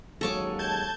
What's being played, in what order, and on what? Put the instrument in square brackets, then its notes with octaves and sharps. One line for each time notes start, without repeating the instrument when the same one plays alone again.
[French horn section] D#2 F#3 [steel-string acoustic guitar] G#3 C#4 G#4 [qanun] A4 C#6 D6
[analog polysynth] A5 G6 G#6